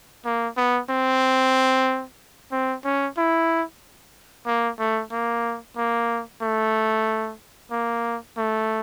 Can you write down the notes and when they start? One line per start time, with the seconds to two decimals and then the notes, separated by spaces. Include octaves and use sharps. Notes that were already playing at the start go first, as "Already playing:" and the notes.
0.25 A#3
0.57 B3
0.90 C4
2.52 C4
2.84 C#4
3.17 E4
4.47 A#3
4.79 A3
5.12 A#3
5.77 A#3
6.42 A3
7.71 A#3
8.37 A3